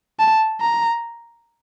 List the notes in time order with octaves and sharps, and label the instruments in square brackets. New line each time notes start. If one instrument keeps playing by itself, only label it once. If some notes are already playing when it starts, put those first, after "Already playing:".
[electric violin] A5
A#5